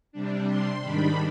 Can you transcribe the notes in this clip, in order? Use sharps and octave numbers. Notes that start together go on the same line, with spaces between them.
C3 G3 D4
C6
G#2 D#3 G3 D4 B5